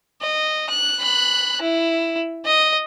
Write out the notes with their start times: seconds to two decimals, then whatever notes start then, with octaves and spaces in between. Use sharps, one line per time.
0.22 D#5
0.70 F#6
1.00 B5 F#6
1.62 E4
2.45 D#5